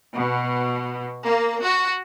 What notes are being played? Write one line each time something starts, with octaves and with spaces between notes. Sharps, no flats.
B2
A#3
F#4